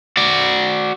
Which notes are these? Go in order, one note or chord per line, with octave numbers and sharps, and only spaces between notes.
F#4 D5